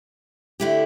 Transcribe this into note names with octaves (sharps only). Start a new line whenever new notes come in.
D3 A3 E4 G4